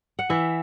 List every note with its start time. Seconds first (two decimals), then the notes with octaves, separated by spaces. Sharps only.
0.19 F#5
0.29 E3 E5